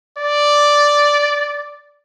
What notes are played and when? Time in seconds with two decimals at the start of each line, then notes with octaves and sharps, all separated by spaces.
0.18 D5